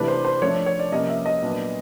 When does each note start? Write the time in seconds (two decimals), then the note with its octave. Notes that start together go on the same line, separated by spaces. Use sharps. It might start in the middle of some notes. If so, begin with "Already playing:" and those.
Already playing: C3 E3 A3 D4 B4
0.08 C5
0.25 C5
0.41 F3 A3 D4 C#5
0.66 C#5
0.79 D5
0.92 C3 F3 A#3 C#4 D#5
1.09 E5
1.26 D#5
1.43 A#2 F#3 B3 D4